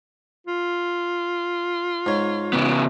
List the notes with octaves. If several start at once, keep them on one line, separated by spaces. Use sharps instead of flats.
F4
G#2 C#5
C#3 B3